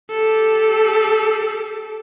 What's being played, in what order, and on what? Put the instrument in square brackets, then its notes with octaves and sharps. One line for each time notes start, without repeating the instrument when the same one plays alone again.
[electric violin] G4 A4